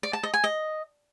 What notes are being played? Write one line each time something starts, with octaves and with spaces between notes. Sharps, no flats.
D5
A5
D#5
G#5
D#5